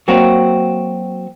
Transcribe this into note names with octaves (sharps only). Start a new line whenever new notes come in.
F#3 A#3 C4 F#4